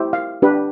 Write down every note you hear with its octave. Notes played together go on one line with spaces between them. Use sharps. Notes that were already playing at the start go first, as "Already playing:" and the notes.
Already playing: E4 G4 C5
F5
D4 G4 B4